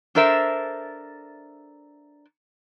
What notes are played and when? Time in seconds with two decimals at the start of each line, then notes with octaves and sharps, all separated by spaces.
0.15 D4 A4 A#4 C5 E5